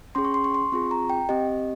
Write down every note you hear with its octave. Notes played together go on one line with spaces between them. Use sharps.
C#4 G#4 C6
C#6
C6
C#6
C6
C4 F4 G#4 C#6
A#5
G5
C4 G4 D#5